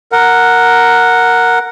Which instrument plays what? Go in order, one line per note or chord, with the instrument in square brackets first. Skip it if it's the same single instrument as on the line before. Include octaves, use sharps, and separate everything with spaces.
[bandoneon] A#4 F#5